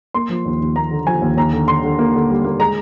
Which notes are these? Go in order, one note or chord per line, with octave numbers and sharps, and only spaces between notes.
A#3 C6
F3
D#2
D#2
A#3 A#5
D3
F3 G#5
D#2
D#2 A#5
D3
D3 C6
D3
A#3
D3
G3
A#3
G#3 A#5